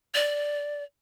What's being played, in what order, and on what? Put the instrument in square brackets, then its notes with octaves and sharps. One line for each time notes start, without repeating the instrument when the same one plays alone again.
[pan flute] D5